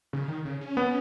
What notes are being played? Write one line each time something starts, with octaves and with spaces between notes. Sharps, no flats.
C#3
D#3
C#3
C#4
B3